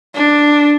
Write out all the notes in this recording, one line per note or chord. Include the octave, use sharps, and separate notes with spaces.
D4